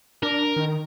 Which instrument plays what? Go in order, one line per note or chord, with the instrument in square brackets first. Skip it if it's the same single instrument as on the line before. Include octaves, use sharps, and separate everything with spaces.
[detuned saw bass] D4 [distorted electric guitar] A#4
[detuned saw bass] D#3